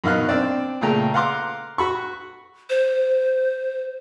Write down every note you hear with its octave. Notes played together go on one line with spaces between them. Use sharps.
F#2 B2 D#4 F5 F6 F#6
C4 D4 D5
A#2 C#3 A3 G5 A#5
F5 F#5 A#5 C6 D6
F#4 B5 C#6
C5